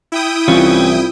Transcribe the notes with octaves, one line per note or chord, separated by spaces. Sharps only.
E4 G5 D#6
C2 E3 C#4 F4